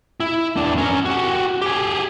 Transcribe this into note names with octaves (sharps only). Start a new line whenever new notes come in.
E4
E2 D4
C#4 A#4
F#4 G4
G4 G#4